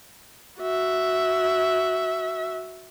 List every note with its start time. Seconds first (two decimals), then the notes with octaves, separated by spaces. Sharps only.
0.60 F#4 E5